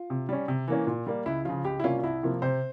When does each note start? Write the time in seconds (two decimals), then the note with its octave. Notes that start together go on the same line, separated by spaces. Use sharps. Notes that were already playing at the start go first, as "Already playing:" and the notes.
Already playing: F4
0.10 C3
0.29 G3 C#4
0.48 C3
0.68 E3 A#3 C#4
0.87 A#2
1.07 G3 A#3
1.26 C#2 E4
1.45 C#3 F3 F4
1.64 C#2 G4
1.80 E4
1.84 C3 G3 A#3 C#4 F4
1.99 F4
2.03 C2 E4
2.23 C3 F3 A#3
2.42 C3 C5